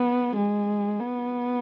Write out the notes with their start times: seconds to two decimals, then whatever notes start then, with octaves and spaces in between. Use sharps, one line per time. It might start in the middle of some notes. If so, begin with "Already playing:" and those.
Already playing: B3
0.36 G#3
1.00 B3